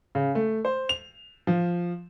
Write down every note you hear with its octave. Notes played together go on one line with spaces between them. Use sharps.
C#3
A3
C5
F7
F3